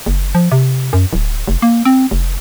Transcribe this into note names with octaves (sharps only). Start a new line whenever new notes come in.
F#1
F3
C3
F#2
D1
F1
A#3
C4
F1